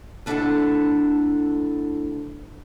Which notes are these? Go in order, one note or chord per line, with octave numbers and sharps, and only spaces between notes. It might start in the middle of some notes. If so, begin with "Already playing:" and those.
D2 D4 E4 A4 F#5 A5